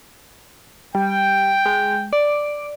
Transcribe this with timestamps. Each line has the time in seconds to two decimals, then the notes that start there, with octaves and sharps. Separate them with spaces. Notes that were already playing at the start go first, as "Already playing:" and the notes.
0.95 G3 G5
1.66 G#3
2.13 D5